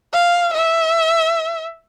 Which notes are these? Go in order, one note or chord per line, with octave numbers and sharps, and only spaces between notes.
F5
E5